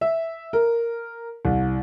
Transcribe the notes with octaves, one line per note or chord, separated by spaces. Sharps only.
E5
A#4
C2